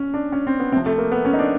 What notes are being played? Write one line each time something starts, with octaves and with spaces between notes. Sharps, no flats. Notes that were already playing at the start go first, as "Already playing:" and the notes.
Already playing: C#4
D4
C#4
C4
B3
C3 F3 C4
A3
A#3
B3
C#4
D#4
D4